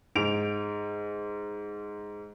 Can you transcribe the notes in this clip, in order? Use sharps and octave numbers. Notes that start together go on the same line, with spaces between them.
G#2 D7 F7